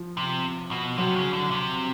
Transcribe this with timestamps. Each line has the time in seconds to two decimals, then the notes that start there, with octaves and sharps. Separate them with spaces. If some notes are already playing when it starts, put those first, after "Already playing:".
Already playing: F3
0.17 C3
0.71 B2
0.98 C3 F#3
1.16 C#3
1.33 D3
1.51 C3